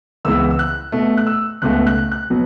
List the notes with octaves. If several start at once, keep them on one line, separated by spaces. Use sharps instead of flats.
C#2 C#3 E3 B3 E6
E6
F#6
B2 A3
F#6
E6
C#2 B2 A3 F#6
F#6
F#6
B2 F#3 B3